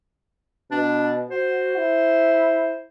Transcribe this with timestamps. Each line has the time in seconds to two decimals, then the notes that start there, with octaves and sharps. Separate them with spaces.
0.71 B2 D4
1.31 F#4 C5
1.77 E4